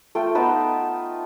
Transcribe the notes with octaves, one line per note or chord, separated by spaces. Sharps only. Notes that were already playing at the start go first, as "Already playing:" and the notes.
A3 F4 G5
B3 D#4 B4 A5